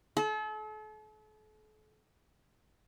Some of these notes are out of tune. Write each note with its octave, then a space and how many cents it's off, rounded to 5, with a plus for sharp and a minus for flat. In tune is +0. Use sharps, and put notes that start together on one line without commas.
A4 -40